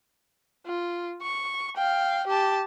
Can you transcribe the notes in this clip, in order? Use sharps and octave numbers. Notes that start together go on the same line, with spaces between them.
F4
C#6
F5 G5
G4 A5